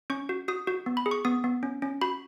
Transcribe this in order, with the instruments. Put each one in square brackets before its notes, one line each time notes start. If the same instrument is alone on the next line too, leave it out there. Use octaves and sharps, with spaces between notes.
[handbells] C#4 C#6
F#4
F#4 D#6
F#4
B3
B5
G#4
C#6
B3 D#6
B3
C#4
C#4
F#4 B5